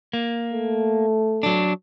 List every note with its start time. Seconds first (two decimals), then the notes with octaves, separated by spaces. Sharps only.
0.13 A#3
0.54 A3
1.43 F#3 D4